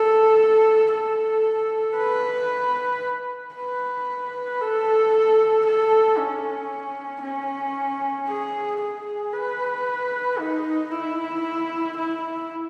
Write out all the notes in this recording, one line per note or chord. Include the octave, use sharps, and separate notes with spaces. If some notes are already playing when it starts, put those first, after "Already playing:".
Already playing: A4
A4
B4
B4
A4
A4
C#4
C#4
G#4
G#4
B4
D#4
E4
E4